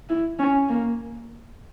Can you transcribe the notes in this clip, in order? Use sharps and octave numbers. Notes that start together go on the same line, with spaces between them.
E4
C#4
A#3